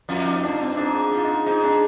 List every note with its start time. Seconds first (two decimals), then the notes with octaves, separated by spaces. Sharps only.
0.09 F2 F4
0.27 D#4
0.43 G2 D4
0.61 C4
0.77 G#2 D4
1.12 G#2 F4
1.24 D#4
1.46 G#2 D#4
1.64 D4